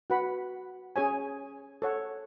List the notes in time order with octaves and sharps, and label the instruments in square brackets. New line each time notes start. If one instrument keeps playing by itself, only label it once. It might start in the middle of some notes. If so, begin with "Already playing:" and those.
[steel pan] F#4 B4 F#5 B5
C#4 G#4 C#5 G#5
A4 C#5 F#5